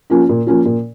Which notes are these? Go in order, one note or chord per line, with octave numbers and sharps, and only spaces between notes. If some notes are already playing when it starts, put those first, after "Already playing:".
F3 A#3 C#4 F4
A#2
F3 A#3 C#4 F4
A#2